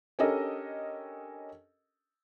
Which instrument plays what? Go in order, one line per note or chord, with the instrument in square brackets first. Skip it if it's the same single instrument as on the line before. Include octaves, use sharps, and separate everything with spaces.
[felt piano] C#4 D4 G4 A4 A#4 D#5